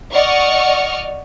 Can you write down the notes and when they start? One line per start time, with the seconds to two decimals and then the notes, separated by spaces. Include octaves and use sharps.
0.13 D5 D#5 F#5 C#6 F6